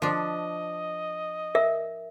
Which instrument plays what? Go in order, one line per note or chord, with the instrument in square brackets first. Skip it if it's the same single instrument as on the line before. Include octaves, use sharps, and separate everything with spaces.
[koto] F3 D4 [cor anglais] D#5
[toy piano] A#4 E5